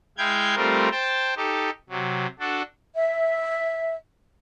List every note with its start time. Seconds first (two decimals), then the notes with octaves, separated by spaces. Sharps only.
0.18 G#3 E4 F5 G5 G6 G#6
0.56 G3 A3 C4 F4 A#4
0.91 C5 G5 A5
1.36 D#4 G4 A4
1.90 C3 F#3
2.39 D4 F#4 A4
2.95 E5